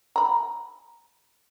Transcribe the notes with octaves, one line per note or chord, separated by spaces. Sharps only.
A#5 B5